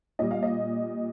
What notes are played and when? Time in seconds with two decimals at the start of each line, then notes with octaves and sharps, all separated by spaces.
0.19 A#2 G3 D#5
0.31 F5
0.43 D#5